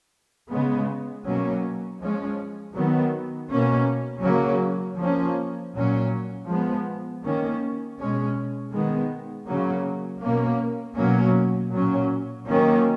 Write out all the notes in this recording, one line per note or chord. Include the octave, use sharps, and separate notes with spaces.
C#3 G#3 B3
B2 F#3 A#3 C#4
F3 G#3 C#4
D#3 F#3 B3
B2 A#3 C#4
C#3 F#3 A#3 C#4
F3 A#3 C#4
A#2 F#3 C#4
F3 G#3 B3
D#3 A#3 C#4
B2 G#3 C#4
D#3 G#3 B3
C#3 F#3 A#3 C#4
B2 A#3 C#4
B2 F#3 A#3 C#4
A#2 F#3 C#4
D#3 F#3 A#3 C#4